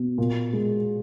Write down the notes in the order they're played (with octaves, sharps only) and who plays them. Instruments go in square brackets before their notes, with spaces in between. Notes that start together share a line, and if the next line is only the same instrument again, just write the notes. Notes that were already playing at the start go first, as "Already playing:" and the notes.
Already playing: [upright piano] B2
A#2
G#3